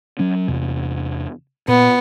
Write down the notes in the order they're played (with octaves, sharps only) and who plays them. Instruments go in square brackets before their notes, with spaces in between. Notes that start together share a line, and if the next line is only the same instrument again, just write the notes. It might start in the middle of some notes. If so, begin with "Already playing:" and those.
[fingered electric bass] F#3 C#4
E2 C3
[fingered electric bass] A#2 [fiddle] B3